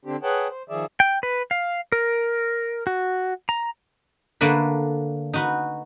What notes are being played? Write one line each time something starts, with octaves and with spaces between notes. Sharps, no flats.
D3 C4 D4 G4
G#4 B4 C#5 F#5 G5 A5
C5
D#3 F3 G#4 D5 E5
G5
B4
F5
A#4
F#4
A#5
D3 A3 A#3 D4 B4
D#4 F#4 B4